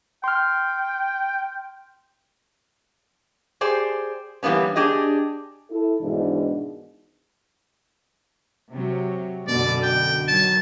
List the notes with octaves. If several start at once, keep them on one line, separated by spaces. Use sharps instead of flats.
G5 C6 F6
G4 G#4 C5 D5
E3 G3 A#3 B3 C#4
D4 G4 G#4 D#5
E4 A4
G#2 B2 D#3 E3 D4
C3 F#3
F#2 B2 D3 D5
G5
D#3 F#3 A5 G#6